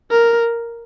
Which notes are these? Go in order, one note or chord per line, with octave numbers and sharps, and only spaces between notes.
A#4